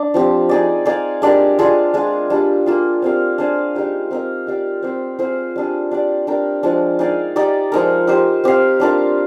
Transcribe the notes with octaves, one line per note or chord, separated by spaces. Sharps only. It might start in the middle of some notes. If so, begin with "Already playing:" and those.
Already playing: D4
F3 C4 G4
D#4 G#4 D5
D#4 G#4 D5 F5
G#3 D4 G4 A#4
G#3 D4 F4 G#4
G#3 D4 F4 G#4
G3 D4 G4
A#3 F4 G#4
C4 G4 A#4 F5
D4 G#4 C5 F5
G#3 D#4 G4 A#4
C4 G4 A#4 D#5
D#4 G4 D5 F5
C4 G4 C5
C4 F4 G#4 C5
G3 D4 G#4
D4 G4 D5
D4 G4 A#4
F3 G#3 D4
D#4 G#4 D5 F5
D#4 G4 D5
F3 G#3 D#4 A#4
D#4 G4 C5
C4 G4 C5 F5
G3 D4 F4 A#4